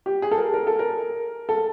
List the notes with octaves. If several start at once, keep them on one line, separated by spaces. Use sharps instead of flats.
G4
G#4
A4
A#4
A#4
A4
A#4
A4